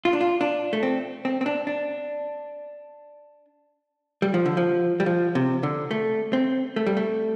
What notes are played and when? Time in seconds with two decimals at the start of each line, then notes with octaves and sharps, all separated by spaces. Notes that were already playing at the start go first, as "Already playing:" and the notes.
0.05 F4
0.13 D4
0.21 F4
0.41 D4
0.73 A3
0.83 C4
1.25 C4
1.41 C4
1.46 D4
1.67 D4
4.22 G3
4.34 F3
4.46 D3
4.57 F3
5.00 G3
5.06 F3
5.35 C3
5.63 D3
5.91 A3
6.33 C4
6.76 A3
6.87 G3
6.97 A3